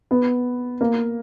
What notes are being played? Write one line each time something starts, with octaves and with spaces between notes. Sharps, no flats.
B3
A#3